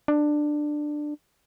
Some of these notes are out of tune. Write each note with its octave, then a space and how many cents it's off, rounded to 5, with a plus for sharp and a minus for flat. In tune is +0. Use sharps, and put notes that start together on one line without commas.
D4 +15